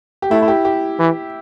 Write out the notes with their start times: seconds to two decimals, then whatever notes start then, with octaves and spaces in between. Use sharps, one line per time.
0.22 G4
0.30 A3 E4
0.42 E4
0.48 G4
0.65 G4
0.99 E3